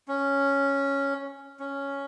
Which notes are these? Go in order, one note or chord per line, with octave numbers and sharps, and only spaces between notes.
C#4
C#4